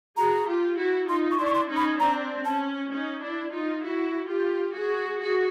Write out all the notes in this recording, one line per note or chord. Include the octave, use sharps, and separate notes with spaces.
F#4 G#4 A#5
F4 G4
E4 F#4
D#4 F4 C6
C#6
D4 E4 C6
C#6
C6
C#4 D#4
B5
C4 D4 A#5
C#4 A5
C#4 D#4
D4 E4
D#4 F4
E4 F#4
F4 G4
F#4 G#4
F#4 G#4